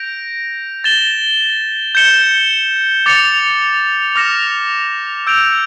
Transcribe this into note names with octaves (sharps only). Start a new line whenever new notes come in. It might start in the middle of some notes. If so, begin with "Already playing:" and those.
Already playing: G6 A#6 D7 F7
A6 E7 G7
G6 C#7 E7 G7
D6 A6 C#7 F7
D6 F6 A#6 C#7 E7
E6 G6 D7 F7